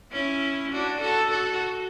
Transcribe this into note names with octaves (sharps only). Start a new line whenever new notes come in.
C#4 E4
D4 F#4
F#4 A4
F#4 A4